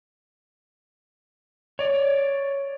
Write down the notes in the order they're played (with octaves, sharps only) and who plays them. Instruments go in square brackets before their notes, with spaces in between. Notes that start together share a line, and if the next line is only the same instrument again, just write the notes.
[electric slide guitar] C#5 D5